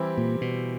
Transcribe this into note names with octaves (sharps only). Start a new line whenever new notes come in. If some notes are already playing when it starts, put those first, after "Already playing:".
Already playing: E3 G3 C4 E4 G4
A#2
B2